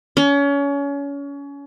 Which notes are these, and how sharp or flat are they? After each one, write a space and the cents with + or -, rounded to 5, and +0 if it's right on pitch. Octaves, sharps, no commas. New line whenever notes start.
C#4 +30